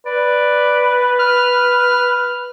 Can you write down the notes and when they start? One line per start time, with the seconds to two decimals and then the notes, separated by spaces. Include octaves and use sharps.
0.06 B4 D5
1.20 F6